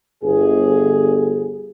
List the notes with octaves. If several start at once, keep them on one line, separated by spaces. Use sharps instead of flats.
G1 G#4